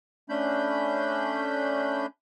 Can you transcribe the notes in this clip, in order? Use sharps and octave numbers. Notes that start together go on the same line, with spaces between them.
A3 C#4 D4 B5 G6